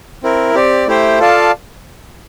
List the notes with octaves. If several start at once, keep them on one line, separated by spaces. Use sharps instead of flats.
C4 E4 A#4
C4 G4 D5
A3 E4 G4 C5 G5
F4 A4 D5 F5 A5